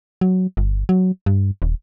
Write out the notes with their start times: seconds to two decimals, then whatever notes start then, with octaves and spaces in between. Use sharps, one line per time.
0.21 F#3
0.57 G1
0.89 F#3
1.26 G2
1.62 D#1